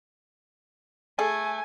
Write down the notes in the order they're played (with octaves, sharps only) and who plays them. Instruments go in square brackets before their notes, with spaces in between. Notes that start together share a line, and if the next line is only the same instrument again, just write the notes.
[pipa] A3 G#4 [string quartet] G#5